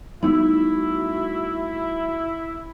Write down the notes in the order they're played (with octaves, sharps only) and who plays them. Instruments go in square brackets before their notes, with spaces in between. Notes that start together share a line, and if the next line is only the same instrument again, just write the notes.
[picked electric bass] G3 A3 B3 [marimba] D#4 [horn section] E4 [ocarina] F#4